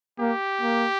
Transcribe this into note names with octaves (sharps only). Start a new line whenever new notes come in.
A#3 G4
A#3